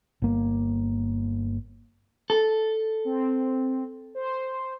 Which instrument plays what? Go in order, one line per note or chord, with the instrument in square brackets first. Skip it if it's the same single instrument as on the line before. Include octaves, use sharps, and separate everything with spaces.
[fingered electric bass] G1 A#3
[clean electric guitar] A4
[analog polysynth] C4
C5